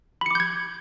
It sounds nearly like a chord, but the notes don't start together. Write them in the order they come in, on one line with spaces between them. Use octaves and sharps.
B5 C#7 D6 G6 G#6